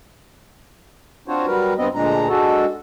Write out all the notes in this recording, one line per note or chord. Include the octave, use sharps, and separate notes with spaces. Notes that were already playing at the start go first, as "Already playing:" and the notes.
C4 D4 F4 F#4 C5 C#5
F#3 G3 A#4 B4
G2 B3 C4 D#5
D2 A#2 G#3 D4 A#5
G#3 D4 F#4 A4